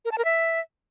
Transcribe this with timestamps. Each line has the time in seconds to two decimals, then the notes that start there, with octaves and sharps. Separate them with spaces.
0.05 A#4
0.12 A5
0.18 A#4
0.25 E5